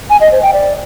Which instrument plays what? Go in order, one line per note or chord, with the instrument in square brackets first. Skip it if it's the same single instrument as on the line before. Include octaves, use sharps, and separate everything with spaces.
[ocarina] G#5
D#5
C5
G5
D5